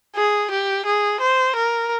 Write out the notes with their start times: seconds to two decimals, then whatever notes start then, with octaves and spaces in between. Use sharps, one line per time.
0.16 G#4
0.51 G4
0.86 G#4
1.20 C5
1.56 A#4